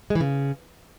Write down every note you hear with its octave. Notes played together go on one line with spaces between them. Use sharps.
G#3
E3
C#3